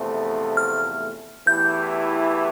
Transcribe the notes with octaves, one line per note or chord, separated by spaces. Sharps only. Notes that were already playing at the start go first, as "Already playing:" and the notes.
Already playing: E2 C3 F3 A3
F6
E2 E3 A3 E4 G4 G6